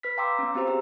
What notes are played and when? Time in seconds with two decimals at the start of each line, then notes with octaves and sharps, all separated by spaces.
0.03 B4 F6 B6
0.17 F5 G5 A#5 C6 D6 E6
0.39 B3 C#4
0.54 B3 C4 F#4 G4 C5 A#5
0.67 G4 G#4 A#5 E6